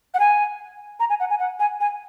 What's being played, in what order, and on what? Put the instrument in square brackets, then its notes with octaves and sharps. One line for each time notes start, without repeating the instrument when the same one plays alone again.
[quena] F#5
G#5
A#5
G#5
F#5
G#5
F#5
G#5
G#5